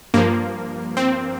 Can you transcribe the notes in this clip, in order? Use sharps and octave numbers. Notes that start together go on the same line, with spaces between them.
G2 F3 A#3
C4